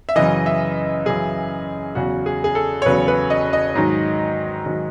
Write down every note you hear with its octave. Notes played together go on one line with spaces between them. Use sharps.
E5
F#2 C#3 E3 D#5
E5
F#2 C#3 E3 G#4
E2 C#3 F#3 F#4
G#4
G#4
A4
C#5
E2 C#3 F#3 B4
B4
D#5
D#5
G#2 D#3 F#3
G#2 D#3 F#3